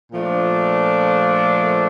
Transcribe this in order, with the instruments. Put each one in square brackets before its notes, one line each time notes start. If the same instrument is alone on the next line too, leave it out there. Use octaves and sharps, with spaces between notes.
[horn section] A#2 F3 A3 D4